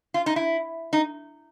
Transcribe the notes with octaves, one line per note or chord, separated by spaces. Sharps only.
F4
D#4
E4
D#4